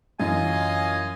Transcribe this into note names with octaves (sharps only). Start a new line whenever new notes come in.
F#2 E3 F4 D#5 G#5